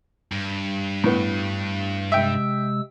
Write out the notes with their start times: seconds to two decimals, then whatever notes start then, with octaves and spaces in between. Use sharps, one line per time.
0.32 G2
1.04 A2 B3
2.12 C3 G#3 E5 G5 E6